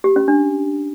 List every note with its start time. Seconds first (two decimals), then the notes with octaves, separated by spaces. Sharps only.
0.04 G4
0.16 C#4
0.28 D4